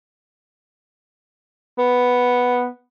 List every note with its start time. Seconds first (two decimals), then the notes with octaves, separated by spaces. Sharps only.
1.79 B3